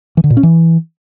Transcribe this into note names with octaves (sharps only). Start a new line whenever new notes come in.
E3
D3
A#2
C#4
E3